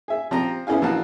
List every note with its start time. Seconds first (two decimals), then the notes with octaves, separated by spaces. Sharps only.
0.08 G#4 E5
0.31 F3 C4 A#5
0.67 B3 C#4 E4 G#4 F5
0.82 A#1 E3 F#4 F5 A5